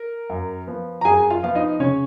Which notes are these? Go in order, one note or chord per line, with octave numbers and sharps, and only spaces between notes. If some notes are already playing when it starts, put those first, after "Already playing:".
Already playing: A#4
F#2
F3 B3
A#5
F#2 G#4 G#5
F4 F5
F3 B3 F5
D#4 D#5
C#3 C#4 C#5